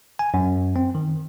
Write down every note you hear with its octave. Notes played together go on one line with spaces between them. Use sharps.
G#5
F#2
C4
D#3